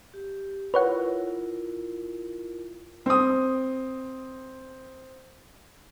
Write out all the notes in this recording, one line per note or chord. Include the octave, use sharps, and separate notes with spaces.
G4
E4 F4 A#4 B4 C#5 F#5
C4 D#6